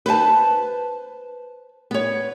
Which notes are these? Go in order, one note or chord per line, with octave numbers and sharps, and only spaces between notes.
B4 C5 F5 A5
B3 C#5